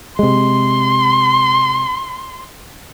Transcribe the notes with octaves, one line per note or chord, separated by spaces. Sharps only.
C3 G#3 C6